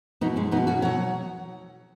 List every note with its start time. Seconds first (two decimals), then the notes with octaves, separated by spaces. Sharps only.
0.21 B2 F#3 B3 D#4
0.36 G#3 C#4
0.51 B2 B3 D#4
0.57 F#3
0.67 C#4 F#4
0.82 B2 F#3 C#5 F#5